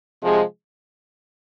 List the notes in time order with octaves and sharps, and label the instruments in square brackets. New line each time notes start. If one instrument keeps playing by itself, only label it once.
[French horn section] C3 F3 G#3